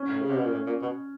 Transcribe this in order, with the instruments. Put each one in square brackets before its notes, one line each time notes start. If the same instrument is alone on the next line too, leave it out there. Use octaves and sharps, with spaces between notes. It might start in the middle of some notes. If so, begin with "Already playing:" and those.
Already playing: [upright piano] C#4
[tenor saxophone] A2
C#3
C3
B2
A#2
A2
A#2
B2